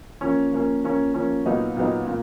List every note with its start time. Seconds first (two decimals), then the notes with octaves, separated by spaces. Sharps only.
0.21 F3 A#3 C#4
0.52 F3 A#3 C#4
0.84 F3 A#3 C#4
1.14 F3 A#3 C#4
1.45 A#2 F#3 B3 D#4
1.77 A#2 F#3 B3 D#4
2.07 A#2